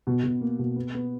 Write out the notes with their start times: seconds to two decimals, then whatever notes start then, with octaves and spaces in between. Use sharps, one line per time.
0.07 B2
0.23 B2
0.41 A#3
0.59 B2
0.76 B3
0.94 B3